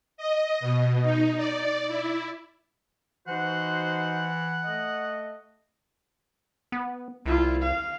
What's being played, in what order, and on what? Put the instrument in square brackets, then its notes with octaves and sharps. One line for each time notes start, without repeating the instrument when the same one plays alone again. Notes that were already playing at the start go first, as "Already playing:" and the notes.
[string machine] D#5
B2
D#4
D5
E4
[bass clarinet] E3 [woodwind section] D#4 F#4 C5 [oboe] F#5
[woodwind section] A3 D#5
[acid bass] B3
[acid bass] C2 [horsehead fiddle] E4 F4
[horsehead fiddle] F5